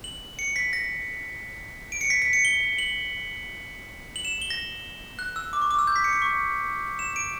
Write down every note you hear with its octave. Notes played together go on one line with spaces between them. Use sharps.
F#7
C#7
B6
A#6
D7
C#7
B6
B6
C#7
G7
F#7
F#7
E7
G7
A#6
F#6
E6
D6
C#6
D6
E6
G6
B6
C#7
B6
C#6
E7
D7